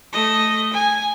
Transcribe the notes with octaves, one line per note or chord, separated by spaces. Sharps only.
A3 D#5
G#5